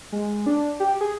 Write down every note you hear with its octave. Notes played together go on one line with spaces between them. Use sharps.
G#3
D4
G4
G#4